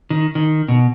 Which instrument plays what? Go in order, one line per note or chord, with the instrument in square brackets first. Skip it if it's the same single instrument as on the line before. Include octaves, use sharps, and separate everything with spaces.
[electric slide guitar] D#3
D#3
B2